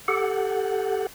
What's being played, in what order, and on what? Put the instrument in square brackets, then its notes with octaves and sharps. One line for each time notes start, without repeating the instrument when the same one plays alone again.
[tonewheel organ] G4 A4 F#5